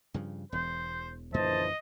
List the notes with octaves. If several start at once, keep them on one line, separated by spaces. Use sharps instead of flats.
G2 C#3 F3
E1 E2 C5
A#1 F#2 D3 E3 A#3 C5 D#5 A5